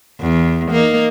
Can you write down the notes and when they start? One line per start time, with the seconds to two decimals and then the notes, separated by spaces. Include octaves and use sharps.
0.20 E2
0.71 A#3 D#4